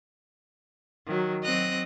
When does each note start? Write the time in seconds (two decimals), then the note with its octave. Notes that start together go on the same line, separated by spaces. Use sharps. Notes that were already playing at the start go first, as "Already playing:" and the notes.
1.06 D#3 F#3
1.44 F#3 C4 D#5 F#6